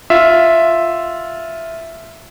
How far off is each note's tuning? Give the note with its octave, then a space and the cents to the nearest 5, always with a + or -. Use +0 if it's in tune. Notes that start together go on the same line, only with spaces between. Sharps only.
F4 +0 E5 +0